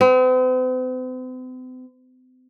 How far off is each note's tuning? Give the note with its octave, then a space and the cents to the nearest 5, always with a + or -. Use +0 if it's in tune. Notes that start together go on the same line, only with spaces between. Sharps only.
C4 -45